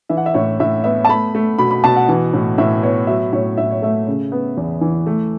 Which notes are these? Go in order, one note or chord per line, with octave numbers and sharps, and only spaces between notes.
E3 E5
F#5
E5
A2 C#5
A2 E5
B3 E5
A5
A3 B5
A3
B2 B5
B5
B2 A5
F#5
E3
A2
A2 E5
B3 C#5
F#3 E5
A2 C#5
A2 E5
C#5
A3 E5
C#3
B3
E2
E3
A3